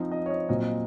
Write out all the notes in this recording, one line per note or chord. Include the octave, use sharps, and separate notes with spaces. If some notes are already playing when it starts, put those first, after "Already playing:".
Already playing: F3 C4 D#4
D#5
C#5
D#5
A#2 F#3 C4 D#5
D#5